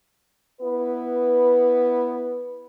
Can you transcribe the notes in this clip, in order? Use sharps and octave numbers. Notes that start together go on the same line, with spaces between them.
B3 E4 B4